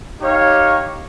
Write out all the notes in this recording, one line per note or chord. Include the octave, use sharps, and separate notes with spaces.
D#4 G4 C#5 F5